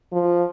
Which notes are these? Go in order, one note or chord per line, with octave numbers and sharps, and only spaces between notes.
F3